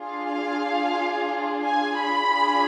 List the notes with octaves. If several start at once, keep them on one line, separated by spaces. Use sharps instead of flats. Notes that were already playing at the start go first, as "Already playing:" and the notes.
Already playing: D4 F4 G#4
F5
G#5
B5
D4 F4 G#4